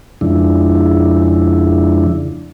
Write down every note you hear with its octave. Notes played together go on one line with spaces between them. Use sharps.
F2 C#3 F3 G#3 D4 E4